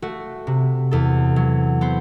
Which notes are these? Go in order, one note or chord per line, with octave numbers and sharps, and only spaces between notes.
A3 F#4
C3
E2 A4
F#3
B3 C5